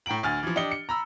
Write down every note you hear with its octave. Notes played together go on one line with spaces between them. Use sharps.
A2 G5 A#5 D7 F#7
D2 G#5 F6 A6
E3 F3
D4 G4 D#5 C#7 G7
C#7
A#5 B5 E6